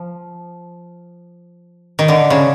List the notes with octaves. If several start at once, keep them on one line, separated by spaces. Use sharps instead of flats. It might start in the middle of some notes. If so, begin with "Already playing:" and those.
Already playing: F3
D#3
D3
C#3